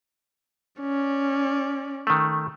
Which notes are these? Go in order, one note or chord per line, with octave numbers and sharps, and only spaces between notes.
C#4 D5
D#3 A3